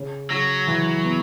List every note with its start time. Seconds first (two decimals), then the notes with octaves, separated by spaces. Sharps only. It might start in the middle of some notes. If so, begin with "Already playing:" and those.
Already playing: C#3
0.30 C#3 F#3
0.67 E3
1.04 B3